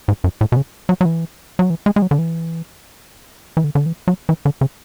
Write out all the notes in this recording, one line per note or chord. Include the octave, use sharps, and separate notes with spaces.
G#2
F#2
A2
B2
C#3
F#3
F#3
E3
F#3
E3
G#3
G#3
F#3
D3
E3
E3
D3
D3
E3
F#3
E3
D3
C#3